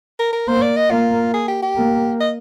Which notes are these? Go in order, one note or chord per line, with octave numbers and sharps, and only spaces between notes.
A#4
A#4
A#3 C5
D5
D#5
A#3 F4
G#4
G4
G4
A#3
D#5